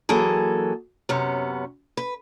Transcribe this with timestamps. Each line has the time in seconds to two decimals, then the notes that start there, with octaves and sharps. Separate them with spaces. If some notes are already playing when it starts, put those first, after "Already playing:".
0.09 E3 F#3 A#3 G#4 A4
1.09 F#2 C3 B3 C#4
1.97 B4